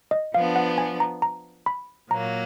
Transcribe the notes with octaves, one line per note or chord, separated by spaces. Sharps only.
D#5
F3 B3 D4 F5
F#5
G#5
A#5
A#5
B5
A#2 F#3 A#3 A#5